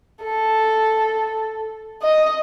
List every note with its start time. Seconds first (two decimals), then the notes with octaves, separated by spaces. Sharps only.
0.24 A4
2.03 D#5